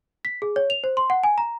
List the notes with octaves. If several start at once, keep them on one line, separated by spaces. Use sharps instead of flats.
B6
G#4
C#5
F7
C5
C6
F#5
G#5
A#5